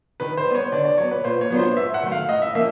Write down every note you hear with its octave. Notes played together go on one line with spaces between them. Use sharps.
D#3 B4
C5
G3
B3 C#5
D3 D5
D5
F#3 B3 C#5
B4
A#2 C5
C#5
F#3 B3 D4 F4
C5
G#2 E5
F#5
D#3 F#3 A3
F5
A2 D#5
E5
F3 A#3 C#4 E5